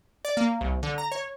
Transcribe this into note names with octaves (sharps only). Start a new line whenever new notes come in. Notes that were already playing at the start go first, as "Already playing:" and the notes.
D5
A#3
C2
D3
A#5
C#5